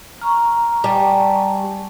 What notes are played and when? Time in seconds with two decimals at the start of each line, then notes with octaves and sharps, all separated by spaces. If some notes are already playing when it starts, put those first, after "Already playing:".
0.21 A#5 C#6 F6
0.84 G3 G#5 A5